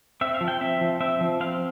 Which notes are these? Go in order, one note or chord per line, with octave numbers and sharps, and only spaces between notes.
C4 E5
F5
F3
G5
C4 E5
F3
C4 E5
F3
C4 F5